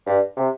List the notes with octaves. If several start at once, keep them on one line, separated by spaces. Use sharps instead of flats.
G2
C3